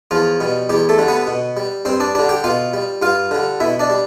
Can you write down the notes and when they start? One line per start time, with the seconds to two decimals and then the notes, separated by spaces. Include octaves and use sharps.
0.11 E2 F3 F4
0.40 B2 G3
0.69 E2 G3 G4
0.89 A3 A4
0.98 D3 G3
1.08 B3 B4
1.27 B2
1.57 G3
1.85 G2 C4 C5
2.00 D4 D5
2.15 D3 G3 D4 D5
2.29 G4 G5
2.44 B2 F4 F5
2.74 G3
3.02 G2 F4 F5
3.31 D3 G3
3.60 B2 E4 E5
3.79 D4 D5
3.90 G3